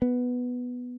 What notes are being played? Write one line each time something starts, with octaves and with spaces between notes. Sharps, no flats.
B3